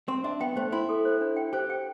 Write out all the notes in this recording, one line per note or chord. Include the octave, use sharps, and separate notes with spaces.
C4 C6
D4 E5
B3 G5
A3 C5
E4 C6
A4
C5
D4
G5
G4 C5
G5